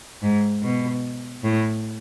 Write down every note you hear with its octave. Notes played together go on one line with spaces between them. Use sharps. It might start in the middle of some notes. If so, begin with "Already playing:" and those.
G#2
B2
A2